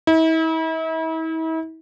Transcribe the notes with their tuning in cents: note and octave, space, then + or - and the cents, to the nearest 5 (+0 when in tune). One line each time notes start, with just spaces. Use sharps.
E4 -40